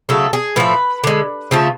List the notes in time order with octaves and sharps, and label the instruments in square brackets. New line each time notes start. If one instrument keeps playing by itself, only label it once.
[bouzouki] C#3 F#3 A3 A4
G#4
A2 F3 A3 B4
D3 G#3
C#3 F3 A3